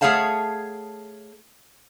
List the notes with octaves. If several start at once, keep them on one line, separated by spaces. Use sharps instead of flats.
A3 G#4 C#5 F5 F#5 A5